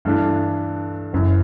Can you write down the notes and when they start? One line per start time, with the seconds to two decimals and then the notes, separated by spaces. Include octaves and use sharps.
0.05 G2 E3 A3 D4
1.13 F#1 F#2 E3